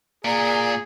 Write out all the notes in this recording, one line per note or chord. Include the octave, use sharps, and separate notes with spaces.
A#2 G#4 D5 A#5